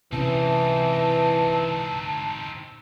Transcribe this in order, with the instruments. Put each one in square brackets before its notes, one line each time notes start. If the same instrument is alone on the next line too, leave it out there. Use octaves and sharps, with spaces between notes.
[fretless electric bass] C3 C#4 [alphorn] E3 [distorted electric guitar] C4 D#4 [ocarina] A5